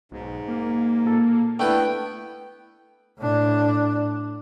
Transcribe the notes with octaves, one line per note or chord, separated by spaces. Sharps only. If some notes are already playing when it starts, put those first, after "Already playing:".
B1 G#2
A#3
A#2 A4
A3 B3 D4 E4 B4 G5
A2 D4